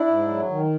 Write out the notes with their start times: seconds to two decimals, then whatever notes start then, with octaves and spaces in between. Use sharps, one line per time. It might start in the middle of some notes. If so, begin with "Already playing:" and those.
Already playing: D4 E4
0.08 G#2
0.27 F#3
0.49 D#3